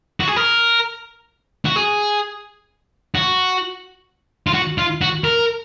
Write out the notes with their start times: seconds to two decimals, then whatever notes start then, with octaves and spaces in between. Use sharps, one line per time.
0.20 F#4
0.28 G#4
0.36 A#4
1.65 F#4
1.76 G#4
3.15 F#4
4.47 F4
4.54 F#4
4.78 F4
5.01 F#4
5.24 A#4